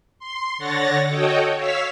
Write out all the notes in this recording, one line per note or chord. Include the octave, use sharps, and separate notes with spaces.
C6
D3 C#5 F#5 A6 A#6
F#4 A4 C#5 D#5 G5
C#5 F5 E6 F6 B6